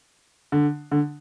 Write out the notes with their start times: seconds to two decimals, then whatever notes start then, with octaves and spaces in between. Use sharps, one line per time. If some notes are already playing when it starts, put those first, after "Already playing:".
0.52 D3
0.91 D3